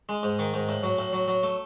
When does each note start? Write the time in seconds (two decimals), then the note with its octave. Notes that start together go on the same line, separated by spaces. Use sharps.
0.09 G#3
0.23 G#2
0.39 D#3
0.54 G#2
0.69 A2
0.83 F#3
0.98 A2
1.13 F#3
1.28 F#3
1.43 A3